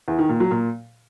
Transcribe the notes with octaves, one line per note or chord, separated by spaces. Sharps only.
E2
D#3
A#2
F#3
A#2